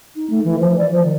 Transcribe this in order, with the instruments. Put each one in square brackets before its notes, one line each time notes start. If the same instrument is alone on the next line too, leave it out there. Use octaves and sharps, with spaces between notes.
[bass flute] D#4
A3
E3
F3
D5
F3
D#3